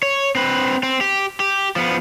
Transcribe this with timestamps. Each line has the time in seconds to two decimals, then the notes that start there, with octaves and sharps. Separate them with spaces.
0.03 C#5
0.35 C4 B4
0.83 C4
1.01 G4
1.40 G4
1.76 F3 B3